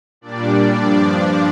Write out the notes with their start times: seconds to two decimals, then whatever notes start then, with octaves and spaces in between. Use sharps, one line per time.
0.21 A#2 G3 D4 D5
0.78 G2 F3 D4 D5